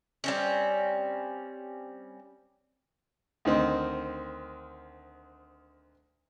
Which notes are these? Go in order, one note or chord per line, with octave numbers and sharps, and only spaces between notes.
G3 C4 C#4
D2 D#3 C4 D#5